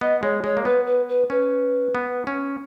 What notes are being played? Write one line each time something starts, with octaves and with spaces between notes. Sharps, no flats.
B3 D#5
G#3 C#5
G#3 C#5
A#3
B3 B4
B4
B4
C#4 B4
B3
C#4